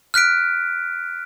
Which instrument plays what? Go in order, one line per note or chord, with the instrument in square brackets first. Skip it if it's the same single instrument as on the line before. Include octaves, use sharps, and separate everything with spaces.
[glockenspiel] F6 F#6 B6 D7